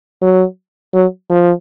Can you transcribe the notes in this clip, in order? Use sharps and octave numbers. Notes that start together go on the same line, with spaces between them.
F#3
F#3
F3